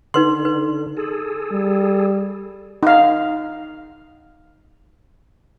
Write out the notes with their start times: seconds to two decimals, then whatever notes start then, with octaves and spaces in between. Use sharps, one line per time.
0.14 D3 D#4 B4 C6
0.45 B4
0.97 G#4 A4
1.52 G3
2.83 D#4 F5